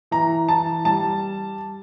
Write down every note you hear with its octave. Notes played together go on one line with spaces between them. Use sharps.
E3 A#5
E3 A5
G3 A5